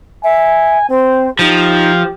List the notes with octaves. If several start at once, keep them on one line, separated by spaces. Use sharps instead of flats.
E5 G#5
C4 C5
F3 D#4 G4